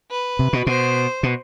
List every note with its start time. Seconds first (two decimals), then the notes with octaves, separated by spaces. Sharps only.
0.11 B4
0.39 C3
0.53 B2
0.67 B2 C5
1.23 B2